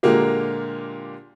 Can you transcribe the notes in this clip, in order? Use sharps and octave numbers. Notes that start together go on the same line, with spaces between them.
A#2 D3 G#3 A#3 G4